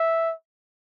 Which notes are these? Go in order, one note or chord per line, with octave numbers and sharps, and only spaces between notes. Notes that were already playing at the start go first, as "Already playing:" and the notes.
Already playing: E5